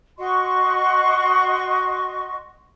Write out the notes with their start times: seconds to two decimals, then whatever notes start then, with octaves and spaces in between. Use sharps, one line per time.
0.18 F#4 D#5 C6 C#6